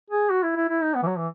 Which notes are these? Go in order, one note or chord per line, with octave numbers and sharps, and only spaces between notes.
G#4
F#4
E4
E4
E4
D#4
B3
E3
F#3
E3